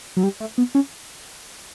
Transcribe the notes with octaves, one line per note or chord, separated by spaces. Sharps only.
F#3
G3
A3
B3
C#4